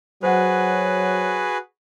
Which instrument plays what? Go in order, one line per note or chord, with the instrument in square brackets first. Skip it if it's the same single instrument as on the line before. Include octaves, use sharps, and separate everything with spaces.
[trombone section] F#3 [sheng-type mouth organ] F#4 G#4 B4 [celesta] C5 F#5